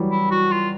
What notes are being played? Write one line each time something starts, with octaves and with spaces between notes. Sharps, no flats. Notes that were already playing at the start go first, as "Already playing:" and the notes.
Already playing: E3 F#3 G3
E4
F#4
F4